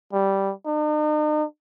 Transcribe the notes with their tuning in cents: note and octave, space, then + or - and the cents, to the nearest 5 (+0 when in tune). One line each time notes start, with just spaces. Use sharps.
G3 -5
D#4 -45